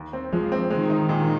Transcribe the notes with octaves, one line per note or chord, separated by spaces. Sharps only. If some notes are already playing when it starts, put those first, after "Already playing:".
Already playing: D#2
C4
F3 G#3
C4
D#3 G#3
D#4
A#2